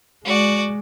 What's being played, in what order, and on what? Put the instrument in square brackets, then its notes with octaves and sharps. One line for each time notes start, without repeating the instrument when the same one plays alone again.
[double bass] G#3 [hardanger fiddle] F#4 D5